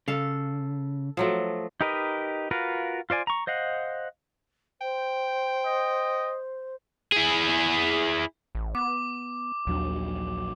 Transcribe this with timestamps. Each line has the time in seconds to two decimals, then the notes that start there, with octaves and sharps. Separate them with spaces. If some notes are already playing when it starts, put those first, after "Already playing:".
0.08 C#3 A4 F5
1.17 F3 F#3 A3
1.81 D#4 G4 A#4 B4 D#5
2.51 F4 F#4 A#4 B4 F5
3.10 F4 C5 D5 G#5
3.27 A#5 C#6
3.47 C5 D#5 F5 F#5
4.81 C5 G5
5.65 D#5
7.12 E4 G#4
8.55 A1
8.75 B3 D6
9.67 A#1 D#2 F#3 D4